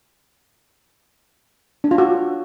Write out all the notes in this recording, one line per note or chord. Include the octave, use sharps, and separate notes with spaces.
D4
F4
F#4